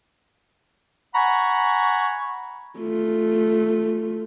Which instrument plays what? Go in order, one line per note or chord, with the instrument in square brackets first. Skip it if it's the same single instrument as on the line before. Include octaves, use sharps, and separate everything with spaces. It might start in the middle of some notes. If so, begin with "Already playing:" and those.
[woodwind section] F#5 G#5 A#5 B5 C#6
[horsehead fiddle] A3 F4